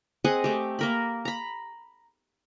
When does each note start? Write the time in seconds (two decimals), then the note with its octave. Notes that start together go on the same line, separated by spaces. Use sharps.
0.24 C4 G#4 D#5 F#5
0.44 A3 G4
0.79 A#3 A#4 B5
1.25 A#5 B5